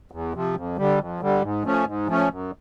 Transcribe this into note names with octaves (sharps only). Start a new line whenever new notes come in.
E2
C3 F3
F2
D3 G3
F2
D3 G3
G#2
F3 A3 C#4
G#2
F3 A3 C#4
F#2